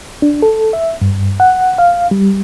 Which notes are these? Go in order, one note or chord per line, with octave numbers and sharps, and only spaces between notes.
D4
A4
E5
G2
F#5
F5
G3